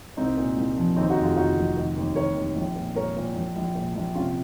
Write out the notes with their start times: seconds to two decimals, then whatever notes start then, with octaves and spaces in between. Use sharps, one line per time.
0.17 C2 C4 D#4
0.37 A#2
0.56 C2
0.77 F3
0.96 D#2 C4 D#4
1.10 D#4 F#4
1.17 F1
1.23 F4 G#4
1.36 F1 D#4 F#4
1.57 F1
1.76 D#3
1.96 D#2
2.16 D#3 A#4 C#5
2.36 D#2
2.56 A#1
2.75 A#2
2.95 A#2 A#4 C#5
3.16 A#2
3.35 A#1
3.56 A#1
3.75 A#2
3.95 A#1
4.15 C3 C#4 F4